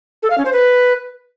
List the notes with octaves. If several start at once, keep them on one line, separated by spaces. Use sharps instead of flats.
A4
F5
C#4
C5
B4